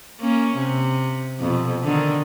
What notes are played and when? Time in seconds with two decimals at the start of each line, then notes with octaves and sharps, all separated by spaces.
0.20 A#3 C#4
0.56 C3
1.39 F2 B2
1.83 D3 D#3